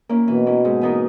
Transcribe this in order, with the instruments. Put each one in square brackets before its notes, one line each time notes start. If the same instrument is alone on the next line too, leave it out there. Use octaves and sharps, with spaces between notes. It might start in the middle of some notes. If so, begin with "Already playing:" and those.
[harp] A#3 C#4 E4
[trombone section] B2 [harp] E3
[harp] A#3 C#4 E4
G#2
E3 B3 D#4 A#4